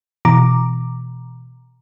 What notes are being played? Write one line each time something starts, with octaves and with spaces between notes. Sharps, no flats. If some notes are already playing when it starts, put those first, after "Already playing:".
B2 E3 A#5 D6